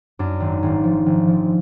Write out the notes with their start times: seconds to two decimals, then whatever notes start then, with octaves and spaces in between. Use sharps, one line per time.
0.19 F#2 D4
0.40 G#1
0.63 G#1
0.84 F3
1.06 G#1
1.28 F3